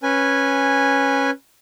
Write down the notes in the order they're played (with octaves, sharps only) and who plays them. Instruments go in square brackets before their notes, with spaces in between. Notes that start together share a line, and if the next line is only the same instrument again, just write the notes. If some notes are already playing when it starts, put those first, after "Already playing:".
[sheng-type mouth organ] C#4 B4 G#5